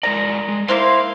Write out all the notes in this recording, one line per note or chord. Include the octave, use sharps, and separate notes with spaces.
G#3 A#4 D5 A#5
G#3
A#3 E4 C5 F5